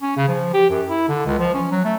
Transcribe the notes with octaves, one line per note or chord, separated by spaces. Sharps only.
C#4
C#3
F3
G4
F#2
E4
D3
C#2
F3
C#4
F#3
A3